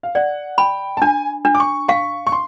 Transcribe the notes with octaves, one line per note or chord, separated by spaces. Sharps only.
F5
D5 F#5
G5 B5
A5
D4 G#5
D4
D6
C#6
F5 C#6
C#6
C6